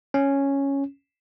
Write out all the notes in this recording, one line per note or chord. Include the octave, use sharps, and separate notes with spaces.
C#4